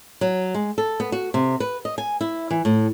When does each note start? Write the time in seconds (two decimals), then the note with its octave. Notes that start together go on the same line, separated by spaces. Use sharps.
0.21 F#3
0.55 G#3
0.78 A4
1.00 B3
1.12 F#4
1.34 C3
1.60 B4
1.85 D#5
1.98 G#5
2.21 E4
2.51 E3
2.65 A2